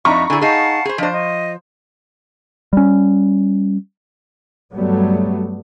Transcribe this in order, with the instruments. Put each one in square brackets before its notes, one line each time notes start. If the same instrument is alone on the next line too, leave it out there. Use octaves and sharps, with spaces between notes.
[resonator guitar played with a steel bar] F2 [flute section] D4 D#4 E5 [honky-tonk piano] A#5 B5 C#6
[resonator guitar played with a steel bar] D3 G#4 [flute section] E4 D5 G#5
[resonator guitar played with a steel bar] D#4 G#4 [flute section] F5 F#5 A5
[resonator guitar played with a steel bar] G#4 C5
[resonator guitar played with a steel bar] F3 C5 [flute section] D4 D#5
[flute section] D#5
[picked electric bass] G3 C#4
[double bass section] G2 F#3 G3 A3 B3